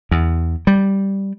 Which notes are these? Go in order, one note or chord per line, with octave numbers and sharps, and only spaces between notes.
E2
G3